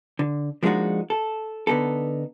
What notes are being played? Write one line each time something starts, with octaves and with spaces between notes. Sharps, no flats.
D3
F3 G#3 A#3 D4 D#4 F#4
A4
D3 B3 D#4 A4